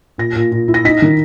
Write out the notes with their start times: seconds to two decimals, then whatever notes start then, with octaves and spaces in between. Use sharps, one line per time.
0.18 A#2 A#6
0.36 A#2
0.52 A#2
0.68 E4
0.74 A#6
0.85 D#4 B6
1.02 D#3